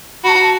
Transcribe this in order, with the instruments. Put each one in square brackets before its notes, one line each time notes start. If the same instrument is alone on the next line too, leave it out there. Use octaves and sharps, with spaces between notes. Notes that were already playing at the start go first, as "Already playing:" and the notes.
[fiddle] F#4 [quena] A5 B5